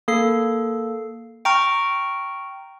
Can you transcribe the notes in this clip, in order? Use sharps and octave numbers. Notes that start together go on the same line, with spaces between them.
A#3 A4 C7
G5 A#5 C#6 F6